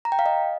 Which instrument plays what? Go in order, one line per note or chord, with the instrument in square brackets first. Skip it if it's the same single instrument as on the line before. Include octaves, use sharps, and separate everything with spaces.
[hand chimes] A#5
G5
F5
D#5